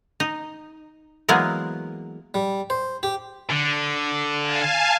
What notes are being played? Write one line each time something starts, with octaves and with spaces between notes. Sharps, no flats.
D#4
E3 F#3 G#3 A#3 B3 G#4
G3
C5
G4
D3
F5 G#5 A5